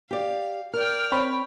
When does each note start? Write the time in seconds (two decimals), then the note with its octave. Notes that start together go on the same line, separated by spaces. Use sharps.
0.11 G4 D5 F5
0.73 A#4 D5 G5 F6
1.12 C4 C#5 G5 B5